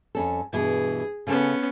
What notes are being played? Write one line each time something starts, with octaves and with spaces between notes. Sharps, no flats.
F2 C#4 A4
G2 B2 E3 G#4
C#3 B3 C#4 A4